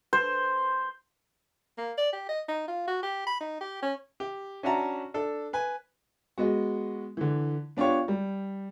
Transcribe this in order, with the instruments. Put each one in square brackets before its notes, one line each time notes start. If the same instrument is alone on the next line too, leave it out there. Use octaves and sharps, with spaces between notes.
[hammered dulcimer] C5
[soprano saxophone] A#3
D5
G4
D#5
D#4
F4
F#4
G4
B5
D#4
G4
C#4
[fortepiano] G4
C#4 D4 F#4 E5 A5 A#5
D4 A4
B4 G#5
[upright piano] G#3 B3 F#4
D3 E3
B3 D4 F4 G4 C#5
G3